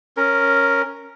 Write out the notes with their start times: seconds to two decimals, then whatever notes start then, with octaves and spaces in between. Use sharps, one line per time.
0.17 C#4 A#4